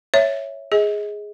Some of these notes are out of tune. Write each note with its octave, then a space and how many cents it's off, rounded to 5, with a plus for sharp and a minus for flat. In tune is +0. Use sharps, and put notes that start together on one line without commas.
C#5 +0 E5 +0
G#4 +0 D#5 +30